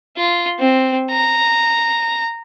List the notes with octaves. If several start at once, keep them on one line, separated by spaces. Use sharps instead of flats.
F4
C4
A#5